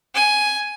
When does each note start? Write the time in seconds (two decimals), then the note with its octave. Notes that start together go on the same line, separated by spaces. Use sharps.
0.15 G#5